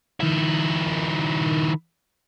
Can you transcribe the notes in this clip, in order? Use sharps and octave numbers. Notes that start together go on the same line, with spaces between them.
D#3 E4